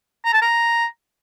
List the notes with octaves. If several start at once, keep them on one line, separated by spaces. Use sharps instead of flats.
A#5
A5
A#5